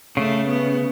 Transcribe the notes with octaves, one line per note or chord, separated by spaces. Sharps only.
C#3 A3
B3